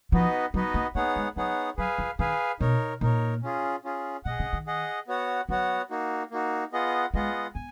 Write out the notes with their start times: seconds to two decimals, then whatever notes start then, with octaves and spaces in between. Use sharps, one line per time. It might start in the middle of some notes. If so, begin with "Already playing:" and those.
0.12 F3 B3 D#4 F#4 B4 D#5
0.54 F#3 B3 D#4 F#4 B4 D#5
0.74 A#3
0.95 A#3 B3 D#4 G#4 C#5 F#5
1.16 G#3
1.36 F#3 B3 D#4 G#4 C#5 F#5
1.77 F#3 G#4 B4 F5 G#5
1.98 F3
2.19 D#3 G#4 B4 F5 G#5
2.60 B2 D#4 A#4 C#5
3.01 A#2 D#4 A#4 C#5
3.43 C#4 F4 G#4
3.84 C#4 F4 G#4
4.25 B2 G#4 D#5 F#5
4.39 C#3
4.53 D#3
4.67 G#4 D#5 F#5
5.07 B3 F#4 C#5 F#5
5.49 F#3 B3 F#4 C#5 F#5
5.90 A#3 D#4 F#4
6.31 A#3 D#4 F#4
6.72 B3 F4 G#4 D#5 F#5
7.14 G#3 B3 F4 G#4 D#5 F#5
7.55 B3 G#5